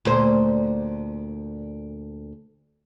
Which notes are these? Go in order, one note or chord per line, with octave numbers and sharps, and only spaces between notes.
D2 A#2 C5